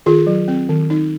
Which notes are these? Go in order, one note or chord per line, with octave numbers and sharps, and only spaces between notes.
D#3 F4 G#4
F#3
C4
D#3
D#4